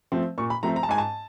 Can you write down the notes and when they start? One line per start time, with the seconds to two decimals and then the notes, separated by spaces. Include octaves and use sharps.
0.12 F3 A3 C4
0.38 A#2 C#6
0.50 B5
0.63 F3 A3 C4 A#5
0.76 A#5
0.83 A5
0.89 G#2 G#5
0.98 A5